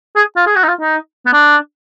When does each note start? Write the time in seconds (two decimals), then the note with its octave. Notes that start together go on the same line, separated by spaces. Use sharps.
0.16 G#4
0.36 F4
0.47 G#4
0.56 F#4
0.64 D#4
0.68 F4
0.81 D#4
1.26 B3
1.33 D4